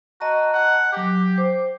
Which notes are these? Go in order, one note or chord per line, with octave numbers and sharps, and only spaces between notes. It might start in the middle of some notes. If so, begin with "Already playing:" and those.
F#4 D#5 A5 A#5
F#5
F#3 G4 D6
C5